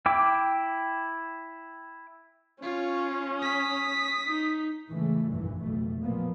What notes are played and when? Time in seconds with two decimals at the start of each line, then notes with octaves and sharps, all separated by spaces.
0.06 E4 G5 D6
2.62 C#4 F4 C#5
3.40 D#6 B6
4.27 D#4
4.88 A2 C#3 E3 G#3 A3
5.28 F1 A#1 G2 A#2 E3
5.59 F#1 B1 F2 B2 A3
6.02 A1 F2 A#2 F3 A#3 B3